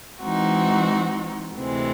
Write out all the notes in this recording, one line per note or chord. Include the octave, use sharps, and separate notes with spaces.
E3 G#3 C4 D#4 F#4
D2 C3 E3 G#3 C4